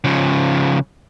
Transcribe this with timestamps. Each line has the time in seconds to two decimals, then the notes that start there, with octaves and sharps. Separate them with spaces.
0.04 C#3 F3